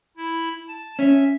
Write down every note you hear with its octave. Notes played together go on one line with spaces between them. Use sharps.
E4
A5
C#4 E5